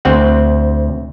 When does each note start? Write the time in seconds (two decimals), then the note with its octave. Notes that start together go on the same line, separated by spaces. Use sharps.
0.05 D2 C4 F#5